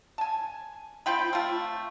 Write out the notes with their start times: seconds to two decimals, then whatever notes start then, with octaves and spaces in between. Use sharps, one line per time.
0.18 G#5 A5
1.06 C4 F4 G5 B5
1.33 A3 F4